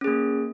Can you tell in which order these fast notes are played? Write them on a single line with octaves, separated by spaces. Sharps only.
C#4 G#4 A#3